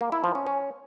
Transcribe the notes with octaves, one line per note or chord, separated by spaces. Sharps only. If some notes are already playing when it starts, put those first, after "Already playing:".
A#3
E4
F3
C#4
C#4